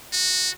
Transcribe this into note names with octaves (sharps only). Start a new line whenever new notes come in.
F#4